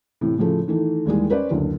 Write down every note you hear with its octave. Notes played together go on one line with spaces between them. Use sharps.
A2 C3 E3
A2 C#3 F3 A3
D#3 E3 A3
D#2 E3 G3 G#3 G#4
C#4 B4 C5 D5
F#1 D2